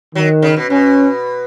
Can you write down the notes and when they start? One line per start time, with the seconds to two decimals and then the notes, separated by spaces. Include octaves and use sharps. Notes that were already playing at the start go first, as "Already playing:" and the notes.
0.15 D#3 F#3
0.42 C#3
0.57 B2
0.70 B2 C#4